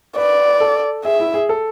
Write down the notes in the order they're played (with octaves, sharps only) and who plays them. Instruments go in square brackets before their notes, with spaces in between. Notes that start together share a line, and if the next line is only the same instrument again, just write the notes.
[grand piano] B4 [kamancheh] D5
[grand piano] A4
[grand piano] G#4 [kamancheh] E5
[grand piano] E4
G#4
A4